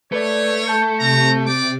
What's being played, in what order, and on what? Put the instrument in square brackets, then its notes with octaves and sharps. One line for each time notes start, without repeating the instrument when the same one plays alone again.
[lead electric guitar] A3 [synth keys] B4 D5 [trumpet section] C#5
[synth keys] A5 G6 C#7
[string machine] C3 [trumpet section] F#4 A#5
[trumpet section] D5 G5 D6